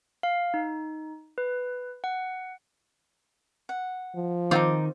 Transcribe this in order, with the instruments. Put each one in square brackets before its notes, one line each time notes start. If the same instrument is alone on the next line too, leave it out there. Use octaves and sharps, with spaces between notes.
[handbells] F5
D#4
B4
F#5
[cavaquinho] F#5
[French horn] F3
[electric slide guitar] D#3 [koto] C4 F4 [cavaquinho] D#4 F#4 D6